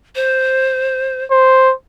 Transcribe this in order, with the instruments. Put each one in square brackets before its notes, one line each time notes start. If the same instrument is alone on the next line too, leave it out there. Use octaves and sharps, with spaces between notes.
[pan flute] C5
[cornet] C5